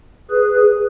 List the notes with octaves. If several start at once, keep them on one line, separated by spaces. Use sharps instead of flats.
G#4 B4